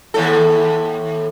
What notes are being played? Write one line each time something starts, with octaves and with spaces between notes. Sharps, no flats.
D#2 A2 A4